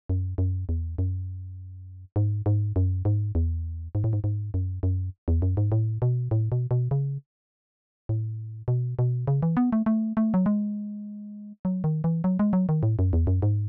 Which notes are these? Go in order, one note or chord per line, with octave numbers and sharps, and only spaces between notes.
F#2
F#2
E2
F#2
G#2
G#2
F#2
G#2
E2
G#2
A2
G#2
G#2
F#2
F#2
E2
F#2
G#2
A2
B2
A2
B2
B2
C#3
A2
B2
B2
C#3
E3
B3
A3
A3
A3
F#3
G#3
F#3
D#3
E3
F#3
G#3
F#3
D#3
A2
F#2
E2
F#2
G#2